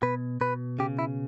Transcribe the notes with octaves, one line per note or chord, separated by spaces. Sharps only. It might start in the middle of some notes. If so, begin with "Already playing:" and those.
B2 B4
B2 B4
C#3 G4
E4